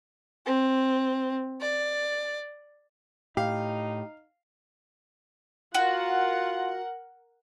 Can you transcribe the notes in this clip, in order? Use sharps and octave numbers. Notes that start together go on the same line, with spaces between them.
C4
D5
A2 D#4 G4 F5
F4 F#4 A#4 F#5